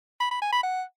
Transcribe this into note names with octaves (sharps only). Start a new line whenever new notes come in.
B5
B5
G#5
B5
F#5